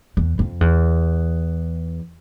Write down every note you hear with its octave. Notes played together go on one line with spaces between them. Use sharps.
E2
F2
E2